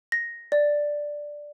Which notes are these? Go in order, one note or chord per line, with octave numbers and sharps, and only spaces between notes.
A#6
D5